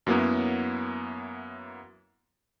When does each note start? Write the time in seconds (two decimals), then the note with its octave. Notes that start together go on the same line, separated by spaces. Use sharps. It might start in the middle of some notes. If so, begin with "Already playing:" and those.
0.07 F#2 F#3 A#3 B3 E4